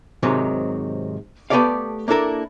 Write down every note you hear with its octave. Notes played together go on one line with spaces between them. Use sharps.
G#2 C3 D#3 F#3
A3 B3 G4 A4 D5 F5
A#3 D4 E4 A4 A#4